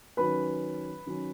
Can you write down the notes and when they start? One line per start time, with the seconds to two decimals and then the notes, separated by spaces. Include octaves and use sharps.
0.17 D#3 F#3 C#4 B4 B5
1.06 D#3 F#3 C#4